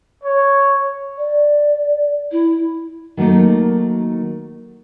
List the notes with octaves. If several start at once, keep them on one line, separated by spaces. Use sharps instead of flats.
C#5
D5
E4
D#3 F#3 A3 A#3 D#4